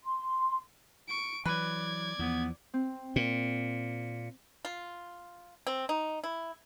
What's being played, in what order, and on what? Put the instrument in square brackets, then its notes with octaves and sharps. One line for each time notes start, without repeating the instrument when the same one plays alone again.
[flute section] C6
[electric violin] C#6 D7
[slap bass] E3 F#3 [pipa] B4 [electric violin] D5 G#6
[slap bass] E2 F3 [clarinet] B3
[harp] C4
[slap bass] A#2
[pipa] F4
C4
D#4
E4